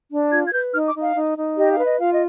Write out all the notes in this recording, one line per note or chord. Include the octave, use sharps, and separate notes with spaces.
D4
F4 G#6
G#6
B4 G6
D#4 F6
D6
D#4
F5
D#4
D#4
G4 D#5
F5
B4
D#5
F4 F5
D#5